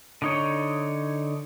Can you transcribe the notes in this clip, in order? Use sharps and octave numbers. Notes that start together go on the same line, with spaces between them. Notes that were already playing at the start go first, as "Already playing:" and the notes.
D3 D#4 C#5